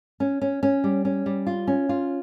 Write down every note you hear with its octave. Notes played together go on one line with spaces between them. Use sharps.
C#4
C#4
C#4
G3
C#4
G3
F4
C#4
F4